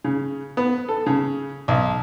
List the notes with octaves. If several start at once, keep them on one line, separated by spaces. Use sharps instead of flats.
C#3
B3
A4
C#3
B1